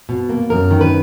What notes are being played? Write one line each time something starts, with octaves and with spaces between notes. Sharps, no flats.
B2
A#3
F#2 A#4
D#3
B4